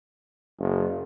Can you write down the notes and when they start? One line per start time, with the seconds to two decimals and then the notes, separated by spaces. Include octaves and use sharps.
0.59 F#1